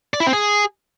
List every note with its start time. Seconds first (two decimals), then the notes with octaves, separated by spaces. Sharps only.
0.14 D5
0.20 E4
0.27 C4
0.33 G#4